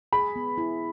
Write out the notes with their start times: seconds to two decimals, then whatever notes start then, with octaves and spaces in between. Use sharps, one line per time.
0.13 G#4 B5
0.36 B3
0.58 E4